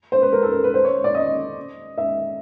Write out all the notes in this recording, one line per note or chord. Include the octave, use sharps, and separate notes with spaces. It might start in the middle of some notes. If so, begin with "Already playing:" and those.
C5
B4
A#4
A4
A#4
B4
C5
C#5
D5
D#5
E5